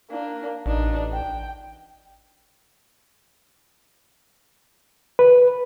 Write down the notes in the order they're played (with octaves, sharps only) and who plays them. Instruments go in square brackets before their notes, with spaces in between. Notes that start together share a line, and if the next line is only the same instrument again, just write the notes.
[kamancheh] A#3 D4
[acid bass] A1 [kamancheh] D4 D#4
[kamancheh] G5
[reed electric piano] B4